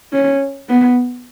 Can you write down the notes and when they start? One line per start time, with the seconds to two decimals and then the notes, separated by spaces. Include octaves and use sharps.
0.13 C#4
0.69 B3